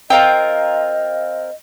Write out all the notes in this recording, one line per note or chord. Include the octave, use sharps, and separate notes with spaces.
C4 F4 A#4 D#5 G5